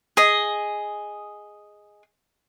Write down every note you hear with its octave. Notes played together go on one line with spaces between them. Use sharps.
G#4 D#5